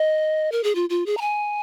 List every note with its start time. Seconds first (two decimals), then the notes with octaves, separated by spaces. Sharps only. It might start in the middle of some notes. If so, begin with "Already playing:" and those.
Already playing: D#5
0.52 A#4
0.64 G#4
0.75 F4
0.90 F4
1.06 G#4
1.17 A#5
1.21 G#5